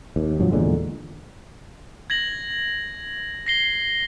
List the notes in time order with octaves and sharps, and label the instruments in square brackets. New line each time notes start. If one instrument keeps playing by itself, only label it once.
[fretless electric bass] D#2
F1 G2 F3 F#3
E2 A#2 D3 G#3
[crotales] G#6 A#6 F#7
A#6 C7 G7